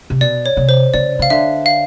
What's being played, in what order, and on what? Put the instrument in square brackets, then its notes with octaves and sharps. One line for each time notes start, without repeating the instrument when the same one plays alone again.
[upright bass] C3
[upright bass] B2 [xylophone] D5
[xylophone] C#5
[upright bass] C3
[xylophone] C5
[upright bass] C#3 [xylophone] D5
[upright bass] C#3 [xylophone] F5
[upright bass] D3 [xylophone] E5
[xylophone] F5